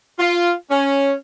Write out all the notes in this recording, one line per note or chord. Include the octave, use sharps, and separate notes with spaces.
F4
C#4